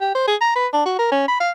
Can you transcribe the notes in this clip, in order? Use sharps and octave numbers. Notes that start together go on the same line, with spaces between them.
G4
C5
G#4
A#5
B4
D4
F#4
A#4
C#4
B5
F5